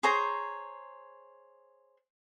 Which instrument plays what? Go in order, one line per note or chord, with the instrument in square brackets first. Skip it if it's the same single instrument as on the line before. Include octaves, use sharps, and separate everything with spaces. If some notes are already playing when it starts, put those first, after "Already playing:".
[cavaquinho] G#4 C5 C#5 A#5